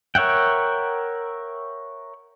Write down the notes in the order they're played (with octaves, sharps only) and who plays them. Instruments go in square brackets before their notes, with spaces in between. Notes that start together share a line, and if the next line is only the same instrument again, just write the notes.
[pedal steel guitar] A#4 C#5 E5 F#5 G5